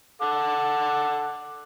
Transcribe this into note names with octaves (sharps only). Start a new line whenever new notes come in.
A4 F#5 D6